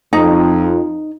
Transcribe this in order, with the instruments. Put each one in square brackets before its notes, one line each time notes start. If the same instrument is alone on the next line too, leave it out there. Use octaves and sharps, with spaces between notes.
[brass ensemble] F2 [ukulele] D#4